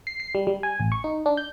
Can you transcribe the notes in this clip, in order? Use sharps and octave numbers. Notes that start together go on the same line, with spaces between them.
C7
C7
G3
G3
G#5
A1
C#6
D#4
D4
G6